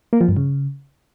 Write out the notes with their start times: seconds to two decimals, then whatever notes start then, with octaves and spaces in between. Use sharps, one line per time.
0.13 A#3
0.21 F3
0.29 G2
0.37 C#3